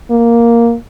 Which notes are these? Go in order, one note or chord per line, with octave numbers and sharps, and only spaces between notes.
A#3